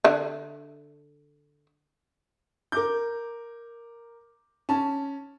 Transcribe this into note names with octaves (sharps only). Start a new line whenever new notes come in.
D3 E5
A#4 D6 G6
C#4 A5